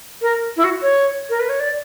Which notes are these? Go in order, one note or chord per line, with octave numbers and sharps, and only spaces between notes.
A#4
E4
F#4
C#5
A#4
B4
C#5
D5